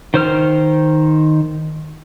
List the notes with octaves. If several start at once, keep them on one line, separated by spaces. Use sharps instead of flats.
D#3 C5 F6